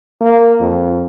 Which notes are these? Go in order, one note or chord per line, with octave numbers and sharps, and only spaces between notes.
A#3
F2